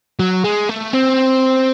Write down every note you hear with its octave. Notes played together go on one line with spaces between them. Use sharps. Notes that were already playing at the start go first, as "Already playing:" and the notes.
F#3
G#3
A3
C4